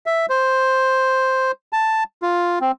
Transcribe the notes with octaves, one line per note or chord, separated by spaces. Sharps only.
E5
C5
A5
F4
C4